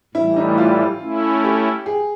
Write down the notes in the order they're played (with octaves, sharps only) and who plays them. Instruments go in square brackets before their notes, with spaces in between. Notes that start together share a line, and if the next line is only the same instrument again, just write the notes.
[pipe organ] A2 E3 G3 [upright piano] E4
[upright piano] D#4
F4
[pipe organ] A3 C#4 E4
[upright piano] G4
G#4